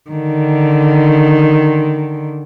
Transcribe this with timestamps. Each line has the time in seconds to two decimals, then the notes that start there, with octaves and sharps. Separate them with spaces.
0.10 D3 D#3